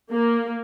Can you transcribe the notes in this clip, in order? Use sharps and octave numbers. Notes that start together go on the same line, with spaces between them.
A#3